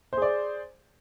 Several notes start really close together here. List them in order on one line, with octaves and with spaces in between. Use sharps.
C5 G#4 D5